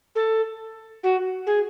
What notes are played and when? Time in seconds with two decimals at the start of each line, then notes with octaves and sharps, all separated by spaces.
0.15 A4
1.03 F#4
1.46 G#4